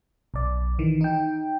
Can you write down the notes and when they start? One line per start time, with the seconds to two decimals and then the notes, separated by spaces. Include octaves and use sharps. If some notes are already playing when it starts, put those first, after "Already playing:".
0.34 B1 D5
0.79 D#3 E3
1.01 D#4 G5